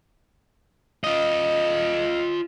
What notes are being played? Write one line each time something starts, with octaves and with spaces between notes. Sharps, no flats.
F4 D#5